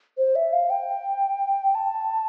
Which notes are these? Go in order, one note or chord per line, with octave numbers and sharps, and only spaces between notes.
C5
E5
F5
G5
A5